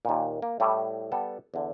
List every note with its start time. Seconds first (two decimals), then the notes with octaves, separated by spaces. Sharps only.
0.05 D#2 A#2
0.42 A#3
0.60 A2 G3 A3 E4
1.12 G3 B3 A4
1.54 E2 D3